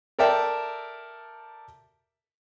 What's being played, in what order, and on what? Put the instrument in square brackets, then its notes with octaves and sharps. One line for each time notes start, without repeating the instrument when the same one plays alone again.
[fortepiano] A4 A#4 D5 E5 G5 A5